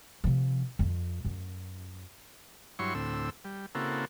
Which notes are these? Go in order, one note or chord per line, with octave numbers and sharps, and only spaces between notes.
C3 F3
F2
F#2
G2 F#3 E4 C#5 C6 C#6
D2 A2 C4 E6
G3
C#3 A#3 C4 E4 F#4 A4